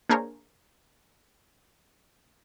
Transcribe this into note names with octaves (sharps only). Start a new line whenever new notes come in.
A#3 D4 G#4 A#4 C5 C#5